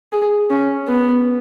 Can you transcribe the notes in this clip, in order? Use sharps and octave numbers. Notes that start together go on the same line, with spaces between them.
G#4
C#4
B3